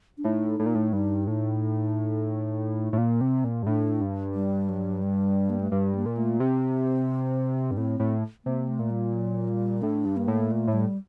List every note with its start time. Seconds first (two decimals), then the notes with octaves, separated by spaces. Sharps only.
0.18 D4
0.24 A2 D#4
0.59 A2
0.66 A#2
0.75 A2
0.93 G2 D#4
1.27 A2 D#4
2.93 A2
2.98 A#2 A#3
3.21 C3 C4
3.44 A#2
3.63 G2
3.66 A2 D4
4.01 G2
4.34 G3
4.69 F#3
5.03 G3
5.50 A#3
5.60 A3
5.72 G2 G3
5.95 A#3
6.06 A#2
6.17 A3
6.40 C3 C4
7.71 G2
7.77 A2 C4
8.00 A2
8.45 C3 A#3
8.68 A3
8.79 A#2
8.90 G3
9.13 F#3
9.49 G3
9.82 A2 D4
10.05 G2
10.17 A#3
10.28 A2
10.50 A#2 A3
10.67 A2
10.73 G3